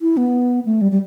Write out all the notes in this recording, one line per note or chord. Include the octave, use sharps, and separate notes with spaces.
E4
B3
A3
G3
G3